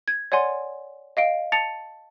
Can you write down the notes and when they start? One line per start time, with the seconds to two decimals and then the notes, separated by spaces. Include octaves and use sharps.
0.08 G#6
0.32 C#5 D5 F#5 G#5 C6
1.17 D#5 F5 D7
1.52 A5 A6 C#7 F7